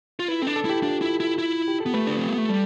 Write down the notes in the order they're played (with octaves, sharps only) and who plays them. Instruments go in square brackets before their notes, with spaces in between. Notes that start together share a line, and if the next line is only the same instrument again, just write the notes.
[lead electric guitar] F4
[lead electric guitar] E4 [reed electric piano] B4
[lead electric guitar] C4 [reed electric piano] A4
[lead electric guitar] D4
[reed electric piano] A4
[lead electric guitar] E4 [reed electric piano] G4
[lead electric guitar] D4 [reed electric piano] F4
[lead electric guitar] E4
E4
E4
[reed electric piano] G4
A4
[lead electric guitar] B3
[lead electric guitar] A3 [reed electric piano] B4
[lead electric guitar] D4
C4
B3
A3
[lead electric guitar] G3 [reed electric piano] A4